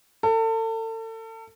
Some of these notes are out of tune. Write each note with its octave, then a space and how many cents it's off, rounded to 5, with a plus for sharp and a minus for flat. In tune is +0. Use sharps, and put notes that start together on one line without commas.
A4 +35